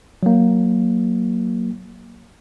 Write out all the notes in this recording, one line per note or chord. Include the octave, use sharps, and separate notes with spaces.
F#3 A#3